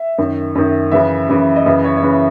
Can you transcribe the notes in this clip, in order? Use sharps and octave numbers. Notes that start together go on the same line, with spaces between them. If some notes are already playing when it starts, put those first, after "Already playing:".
Already playing: E5
F#2 D#3
F#2 D#3
F#2 C#3 E3 E5
F#2 C#3 E3
D#5
F#2 C#3 E3 E5
C#5
C#5
C#3 E3 B4